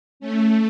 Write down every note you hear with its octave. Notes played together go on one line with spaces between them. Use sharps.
A3 C#4